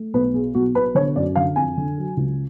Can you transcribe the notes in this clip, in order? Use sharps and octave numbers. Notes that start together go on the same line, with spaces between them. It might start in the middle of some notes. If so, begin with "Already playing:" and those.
Already playing: A3
B1 B4
B2 G#4
B1 F#4
B2 B4
D3 C#5
F#2 D5
D3 F5
F2 G#5
D3
F#3
C#2